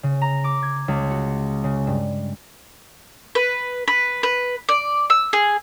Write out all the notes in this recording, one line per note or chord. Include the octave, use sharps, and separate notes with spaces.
C#3
A#5
D6
G#6
C#2
F#4
C#3
G2
B4
B4
B4
D5
E6
G#4